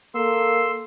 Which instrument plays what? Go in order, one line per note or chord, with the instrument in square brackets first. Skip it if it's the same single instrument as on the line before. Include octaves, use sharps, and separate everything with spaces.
[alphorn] A#3 [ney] A4 [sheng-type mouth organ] C6 E6